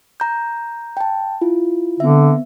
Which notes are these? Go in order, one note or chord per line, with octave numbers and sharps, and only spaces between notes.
A#5 G6
G5 A5
E4 F4
D3 B3 C4 E5